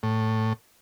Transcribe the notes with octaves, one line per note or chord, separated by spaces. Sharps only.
A2